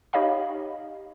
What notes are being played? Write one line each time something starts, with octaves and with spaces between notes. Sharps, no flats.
D#4 G4 C#5 D#5 F5 B5